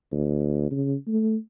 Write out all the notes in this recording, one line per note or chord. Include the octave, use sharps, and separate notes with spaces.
D2
C#3
A3